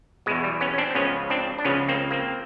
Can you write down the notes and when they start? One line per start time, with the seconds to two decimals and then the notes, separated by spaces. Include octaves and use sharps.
0.26 B2 G#3
0.30 E2
0.44 G3
0.61 B3 C#4
0.74 C#4
0.78 C4 D4
0.91 C4
0.95 C#2 C#3 F3 B3 C#4
1.30 C4 D4
1.58 D4
1.64 C#2 C#3 F3 B3 C#4
1.88 A#3 C4
2.11 A#3 C4